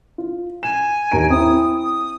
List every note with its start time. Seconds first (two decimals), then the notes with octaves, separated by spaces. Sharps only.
0.18 F4
0.63 G#5 E7
1.11 D#2 A#5 D7
1.30 C4 E4 D#6
1.77 D#6